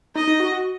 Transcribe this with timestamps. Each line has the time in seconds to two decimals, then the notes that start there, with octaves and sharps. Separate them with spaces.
0.15 D#4 D#5
0.27 D#4
0.40 F#4
0.52 F#4